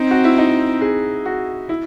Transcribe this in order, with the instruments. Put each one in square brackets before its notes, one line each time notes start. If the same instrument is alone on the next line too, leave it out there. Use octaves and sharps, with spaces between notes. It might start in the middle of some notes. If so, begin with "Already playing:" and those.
Already playing: [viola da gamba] C4 [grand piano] D#4
[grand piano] F#4
E4
D#4
G#4
F#4
E4